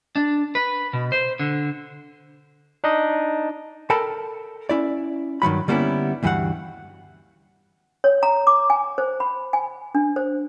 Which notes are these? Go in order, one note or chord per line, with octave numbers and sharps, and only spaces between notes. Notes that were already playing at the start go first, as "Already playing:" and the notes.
D4
B4
B2
C5
D3
D4 D#4 D#5
A4 A#4 G5 A5 B5
C#4 E4 D5
G2 D#3 F#3 B5
D3 G3 A#3 B3 C#4 E4
D2 G2 E3 G3 F5 F#5
C#5
A#5
D6
G#5
C5
B5
G#5
D4
C5